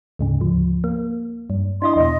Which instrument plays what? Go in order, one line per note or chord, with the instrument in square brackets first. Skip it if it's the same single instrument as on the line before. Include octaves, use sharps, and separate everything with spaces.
[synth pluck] D2 G#2 C#3
D2 F3
A#3
G2
[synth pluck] D4 E4 D#5 [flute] C6
[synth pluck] E2 B2 [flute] D#5